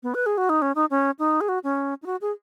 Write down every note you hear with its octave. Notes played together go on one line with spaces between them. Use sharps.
B3
B4
G#4
F#4
D#4
C#4
D#4
C#4
D#4
G#4
F#4
C#4
D#4
F#4
G#4